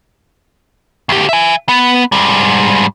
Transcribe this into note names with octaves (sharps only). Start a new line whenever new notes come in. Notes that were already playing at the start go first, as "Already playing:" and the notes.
D2 G4
E5 G#5
B3
G#2 G3